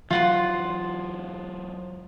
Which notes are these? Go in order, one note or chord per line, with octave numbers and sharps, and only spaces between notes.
E3 F#3 F4 F#5 C6